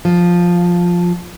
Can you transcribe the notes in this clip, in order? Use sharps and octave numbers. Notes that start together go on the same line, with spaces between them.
F3